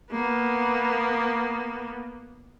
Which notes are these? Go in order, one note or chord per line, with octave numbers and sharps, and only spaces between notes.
A#3 B3